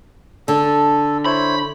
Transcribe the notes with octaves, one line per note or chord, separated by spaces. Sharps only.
D3 A4
E4 C5 C#5 B5